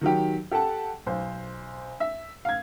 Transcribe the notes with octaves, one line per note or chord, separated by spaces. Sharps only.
D#3 F#3 G4
G4 A4 F#5 A5
B1 C5
E5
F5 G#6